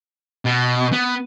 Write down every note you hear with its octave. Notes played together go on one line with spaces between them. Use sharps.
B2
B3